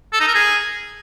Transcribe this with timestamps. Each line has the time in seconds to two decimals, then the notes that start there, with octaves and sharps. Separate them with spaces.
0.13 A4
0.20 D#4
0.27 A#4
0.35 G#4